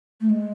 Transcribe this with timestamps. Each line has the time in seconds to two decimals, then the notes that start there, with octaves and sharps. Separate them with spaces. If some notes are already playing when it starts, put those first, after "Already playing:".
0.21 A3
0.30 G#3